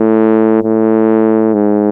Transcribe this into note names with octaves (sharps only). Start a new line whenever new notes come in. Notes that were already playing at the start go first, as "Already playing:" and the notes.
Already playing: A2
A2
G#2